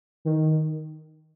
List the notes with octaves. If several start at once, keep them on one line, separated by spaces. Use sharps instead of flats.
D#3